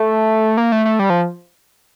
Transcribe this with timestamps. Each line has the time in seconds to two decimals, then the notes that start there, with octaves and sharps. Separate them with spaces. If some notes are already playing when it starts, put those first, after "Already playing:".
Already playing: A3
0.57 A#3
0.72 A3
0.85 A3
0.99 G3
1.10 F3